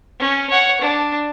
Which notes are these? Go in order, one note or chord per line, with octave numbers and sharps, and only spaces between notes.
C#4
C#5 F#5
D4